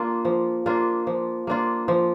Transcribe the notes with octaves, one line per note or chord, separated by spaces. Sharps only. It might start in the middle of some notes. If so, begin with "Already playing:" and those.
Already playing: A#3 D4 F4
F3
A#3 D4 F4
F3
A#3 D4 F4
F3